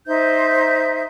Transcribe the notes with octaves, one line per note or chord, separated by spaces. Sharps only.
D#4 C5 E5 G6